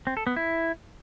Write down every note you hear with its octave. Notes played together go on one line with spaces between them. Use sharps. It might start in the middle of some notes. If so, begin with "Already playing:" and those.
C4
A4
B3
E4